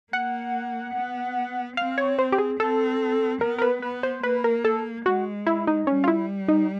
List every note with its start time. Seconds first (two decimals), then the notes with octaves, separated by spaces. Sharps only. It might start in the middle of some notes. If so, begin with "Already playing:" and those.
0.13 A#3 F#5
0.95 B3
1.77 C4 F5
1.98 C#5
2.19 C5
2.32 G4
2.38 G#4
2.60 C4 A4
3.41 B3 A#4
3.58 A#4
3.62 B4
3.82 B3 B4
4.03 C5
4.23 A#3 B4
4.44 A#4
4.65 A4
5.05 G#3 F#4
5.47 E4
5.67 D#4
5.87 G3 C#4
6.04 F4
6.08 E4
6.48 D#4